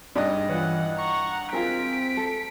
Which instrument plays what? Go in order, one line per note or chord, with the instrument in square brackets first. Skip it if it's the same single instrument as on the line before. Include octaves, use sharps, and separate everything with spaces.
[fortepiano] G2 D#5 [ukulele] D#4 G#4 D5
[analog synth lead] E3 [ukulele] F4 C#5 [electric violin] F#5
[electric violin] F#5 A#5 [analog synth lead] C#6
[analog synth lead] C4 [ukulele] F4 G#4 A#4 [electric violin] B6 D7
[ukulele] A4